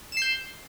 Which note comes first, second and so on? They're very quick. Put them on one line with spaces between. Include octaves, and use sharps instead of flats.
E7 C7 G6